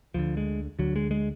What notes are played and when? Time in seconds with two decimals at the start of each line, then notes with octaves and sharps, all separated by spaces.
0.14 D2 D3 F3
0.37 G#3
0.79 D2 D3 F#3
0.96 G#3
1.11 G#3